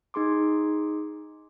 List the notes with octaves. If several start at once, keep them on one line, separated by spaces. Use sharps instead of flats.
D#4 G#4 C6 D6